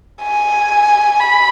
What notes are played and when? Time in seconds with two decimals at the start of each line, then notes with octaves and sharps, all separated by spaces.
0.22 G#5
1.20 B5